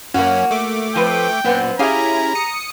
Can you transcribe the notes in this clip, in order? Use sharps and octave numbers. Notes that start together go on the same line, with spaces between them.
F#2 A#3 C#4 F#4
A3 D6
F3 C4 B4 G5
F#2 A#2 B3 C4
C#4 E4 G4 G#4 F5 A#5
D#6 C#7